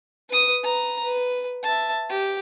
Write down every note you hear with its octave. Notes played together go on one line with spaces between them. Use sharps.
B4 D#6
B4 A#5
B4
E5 A5
G4